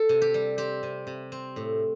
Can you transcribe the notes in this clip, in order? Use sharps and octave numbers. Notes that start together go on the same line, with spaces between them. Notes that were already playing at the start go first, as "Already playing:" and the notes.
Already playing: A4
C3
G4
G3
C4 G4
C3
C3
C4
A2